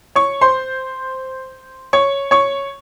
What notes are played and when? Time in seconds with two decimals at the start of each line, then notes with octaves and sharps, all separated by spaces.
0.15 C#5 C#6
0.41 C5 C6
1.93 C#5 C#6
2.31 C#5 C#6